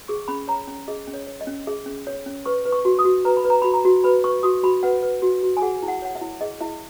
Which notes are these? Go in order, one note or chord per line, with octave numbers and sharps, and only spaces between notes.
G#4 C#6
C#4 B5
C#5 A#5
C#4
G#4 D#5
C#4
C#5
C#5
D#5
C#4
G#4 E5
C#4
C#5
C#4
B4 C#6
B4
C#6
F#4
D#6
F#4
B4 A#5
B5
B4
A#5
F#4 B5
A#5
F#4
B4 B5
B4 C#6
F#4 D#6
F#4 B5
B4 F#5
B4
F#4
F#4
G#5
G#4 F#5
E4
F#5
C#5 F#5
E5
E4
G#4 D#5
E4 E5